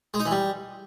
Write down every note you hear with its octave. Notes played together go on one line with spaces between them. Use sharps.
G#3
D#4
E3
G3